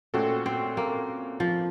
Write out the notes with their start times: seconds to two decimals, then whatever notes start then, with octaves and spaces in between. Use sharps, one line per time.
0.14 A#2 A3 C4 C#4 F#4 A4
0.46 C4
0.77 A#3
1.40 F3